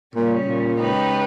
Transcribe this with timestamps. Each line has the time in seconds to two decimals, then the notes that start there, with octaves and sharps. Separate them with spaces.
0.15 A#2 C#3 G3 C#4
0.47 A#2
0.78 C#3 G#3 D#4 G4 B4